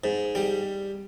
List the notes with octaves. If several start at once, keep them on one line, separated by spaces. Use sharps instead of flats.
G#2
G3